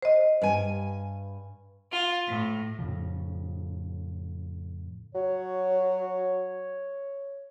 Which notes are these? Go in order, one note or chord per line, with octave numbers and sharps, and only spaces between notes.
C5 D#5
G2 G#5
F4
A2
F2 A2 C#3 F3
F#3 C#5